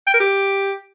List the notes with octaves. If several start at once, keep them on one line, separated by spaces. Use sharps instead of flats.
G5
A#4
G4